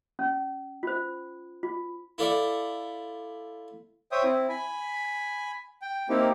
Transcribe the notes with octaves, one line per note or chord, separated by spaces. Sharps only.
C#4
F4 C5
F4
E4 F4 A4 D5 E5
C5 C#5 E5 G5 D#6
C4 E4
G#5 B5
G5
A#3 C4 D#4 E4 G4